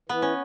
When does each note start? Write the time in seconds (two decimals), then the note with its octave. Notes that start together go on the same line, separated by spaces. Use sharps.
0.09 E3 B3
0.22 C#4